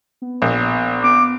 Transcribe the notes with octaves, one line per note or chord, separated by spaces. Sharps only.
B3
A#1
B3 D6